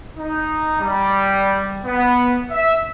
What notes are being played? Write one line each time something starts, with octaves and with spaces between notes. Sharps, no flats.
D#4
G3
B3
E5